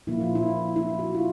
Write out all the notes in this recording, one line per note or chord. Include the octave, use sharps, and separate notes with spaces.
A#2 F3 A#3 E4
F4
E4
E4
F#4
F4